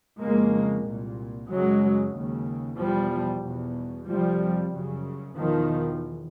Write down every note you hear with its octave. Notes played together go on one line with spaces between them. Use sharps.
F2 C#3 G#3 A#3
C2 A#2
F#2 C#3 F#3 G#3
D#2 C#3
E2 B2 F3 G3
E2 B2
F2 C3 F3 G3
F#2 C#3
E2 B2 D#3 F3